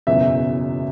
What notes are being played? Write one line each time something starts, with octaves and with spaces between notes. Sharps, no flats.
F#1 E2 B2 F#3 E5